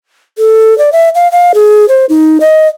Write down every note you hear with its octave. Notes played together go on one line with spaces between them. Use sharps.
A4
D5
E5
F5
F5
G#4
C5
D#4
D#5